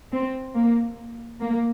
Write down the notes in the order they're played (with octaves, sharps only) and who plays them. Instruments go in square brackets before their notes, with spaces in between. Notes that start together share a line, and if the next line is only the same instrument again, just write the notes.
[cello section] C4
A#3
A#3